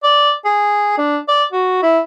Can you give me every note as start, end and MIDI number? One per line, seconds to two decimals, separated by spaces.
0.03 0.33 74
0.45 0.97 68
0.98 1.19 62
1.28 1.44 74
1.52 1.78 66
1.82 1.99 64